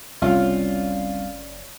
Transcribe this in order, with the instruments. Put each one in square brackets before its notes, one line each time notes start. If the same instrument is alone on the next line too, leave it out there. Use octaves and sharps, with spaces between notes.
[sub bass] F#1 [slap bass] C2 C3 [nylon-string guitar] C#4 D5 F5 [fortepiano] F4